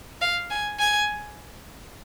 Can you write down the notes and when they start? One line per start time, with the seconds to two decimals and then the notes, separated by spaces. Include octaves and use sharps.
0.21 F5
0.50 G#5
0.79 G#5